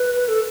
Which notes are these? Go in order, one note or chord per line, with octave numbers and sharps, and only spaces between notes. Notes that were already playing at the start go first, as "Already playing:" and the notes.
Already playing: B4
A4